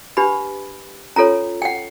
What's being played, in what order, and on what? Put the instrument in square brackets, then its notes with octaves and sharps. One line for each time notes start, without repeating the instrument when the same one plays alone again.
[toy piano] D4 G4 B4 B5
C#4 F4 A4 C#5 A#5
G5
F#5